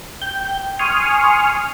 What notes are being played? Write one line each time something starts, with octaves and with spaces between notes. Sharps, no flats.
G5 G6
G#5 C6 C#6 D#6 F6